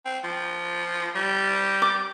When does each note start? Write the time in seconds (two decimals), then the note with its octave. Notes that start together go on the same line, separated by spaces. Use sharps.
0.05 C4
0.24 F3
1.15 G3
1.82 D6